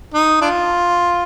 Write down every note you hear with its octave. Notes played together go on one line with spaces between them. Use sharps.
D#4
D4 F4